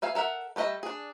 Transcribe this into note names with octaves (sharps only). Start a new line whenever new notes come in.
B4 E5 F5 G#5
A4 A#4 E5 F#5
G3 A3 B3 D#5 E5
D4 G#4